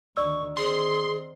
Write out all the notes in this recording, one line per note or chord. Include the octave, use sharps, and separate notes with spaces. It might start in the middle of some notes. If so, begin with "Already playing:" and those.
D2 D#3 D5 C#6 E6
D#3 C4 G#4 C6